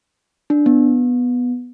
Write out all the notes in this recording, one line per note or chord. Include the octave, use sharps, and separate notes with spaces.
D4
B3